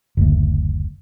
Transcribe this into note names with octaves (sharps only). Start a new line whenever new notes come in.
F#1 D2